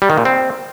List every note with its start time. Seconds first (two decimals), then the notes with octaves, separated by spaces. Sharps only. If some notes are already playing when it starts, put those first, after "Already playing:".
0.02 G3
0.10 D#3
0.18 A#2
0.25 C4